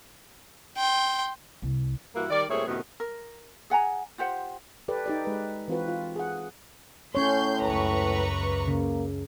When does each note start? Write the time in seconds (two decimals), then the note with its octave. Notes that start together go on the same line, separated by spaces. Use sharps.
0.77 G5 C6
1.62 C2
2.15 G2 E3 A#3 E4 F#4 A#4
2.30 D#3 G3 A#4 D5
2.49 A#2 G3 A3 C4 G#4 C#5
2.67 F#2 A2 C3 D#3 F#3 B3
3.00 A#4
3.70 G#4 F#5 G#5 A#5
4.18 F4 G4 C5 F#5
4.88 G4 A4 B4 D5
5.06 D#4 G4 D5
5.25 G#3 B4
5.68 E3 C4 F4 F#4 B4
5.88 F4
6.16 G#4 F#5
7.15 A2 C#4 C#5 C6 G6
7.62 C#2 F#2 B4 A#5 C#6
8.68 C#3 A#3